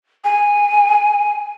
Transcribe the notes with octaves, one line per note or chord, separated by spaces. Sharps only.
G#5